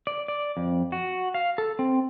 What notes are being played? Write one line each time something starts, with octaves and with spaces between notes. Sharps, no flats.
D5
D5
F2
F#4
F5
A4
C4